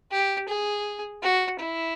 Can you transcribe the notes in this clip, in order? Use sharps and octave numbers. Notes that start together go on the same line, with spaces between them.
G4
G#4
F#4
E4